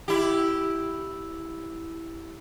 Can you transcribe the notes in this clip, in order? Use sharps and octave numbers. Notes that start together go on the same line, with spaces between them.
E4 G4